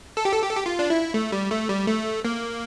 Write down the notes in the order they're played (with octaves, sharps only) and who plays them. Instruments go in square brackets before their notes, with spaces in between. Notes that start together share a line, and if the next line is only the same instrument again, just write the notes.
[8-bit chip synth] A4
G4
A4
G4
A4
G4
F4
D4
E4
A3
G3
A3
G3
A3
A#3